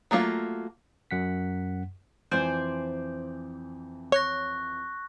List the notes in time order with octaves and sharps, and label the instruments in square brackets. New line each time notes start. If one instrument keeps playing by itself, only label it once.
[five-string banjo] F#3 A3 A#3 F4
[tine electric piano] F#2 F#5 B6
[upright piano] F2 E3 [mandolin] C5 D5 G#5
[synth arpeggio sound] C#5 [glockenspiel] C#6 F#6 A#6